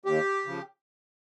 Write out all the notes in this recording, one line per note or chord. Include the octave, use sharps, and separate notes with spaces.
D#2 G4
C#3 F3